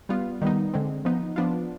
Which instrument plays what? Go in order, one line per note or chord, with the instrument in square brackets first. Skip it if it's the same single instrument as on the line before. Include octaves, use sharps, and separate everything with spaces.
[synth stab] G3 B3 F4
D#3 G3 B3 D#4
D3 G#3 C4
F3 B3 D#4
F3 B3 D4 F4